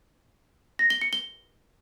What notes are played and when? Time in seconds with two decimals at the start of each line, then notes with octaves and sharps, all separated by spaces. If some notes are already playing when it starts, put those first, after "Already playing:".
0.79 A#6
0.90 G7
1.01 C#7
1.13 G7